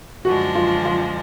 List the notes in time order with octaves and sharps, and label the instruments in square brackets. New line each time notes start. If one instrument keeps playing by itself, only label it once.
[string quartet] F#2 D3 F3 G#3 D4 [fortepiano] F#4
[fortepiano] F4
F4